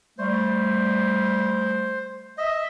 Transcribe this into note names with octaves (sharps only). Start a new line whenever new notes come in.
G3 A3 C5
D#5 E5